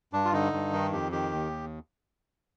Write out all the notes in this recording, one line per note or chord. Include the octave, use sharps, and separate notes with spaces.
G2 D4
F4
D3 D#4
G2
D#3
F2 G4
D#3 G4
D#2